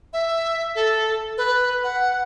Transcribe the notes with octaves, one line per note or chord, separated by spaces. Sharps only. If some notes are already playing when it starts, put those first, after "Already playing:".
E5
A4
B4
F#5